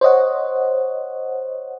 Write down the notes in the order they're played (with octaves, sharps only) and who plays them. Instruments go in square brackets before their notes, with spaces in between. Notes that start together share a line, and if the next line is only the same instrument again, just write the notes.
[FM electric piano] C5 C#5 D#5 F#5